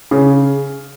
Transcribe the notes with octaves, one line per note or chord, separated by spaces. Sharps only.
C#3